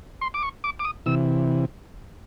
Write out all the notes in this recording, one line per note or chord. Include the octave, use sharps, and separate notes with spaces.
C6
D6
C#6
D6
D6
D#6
C3 E3 E6